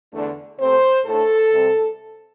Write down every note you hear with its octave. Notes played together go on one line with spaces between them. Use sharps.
E2 D3 A3 D4
C3 A3 C4 C5
A2 A3 D4 A4
C3 G3 C4